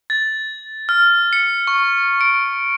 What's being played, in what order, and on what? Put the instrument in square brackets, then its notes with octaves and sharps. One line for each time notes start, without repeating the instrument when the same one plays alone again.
[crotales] A6
F6
C#7
C#6
D7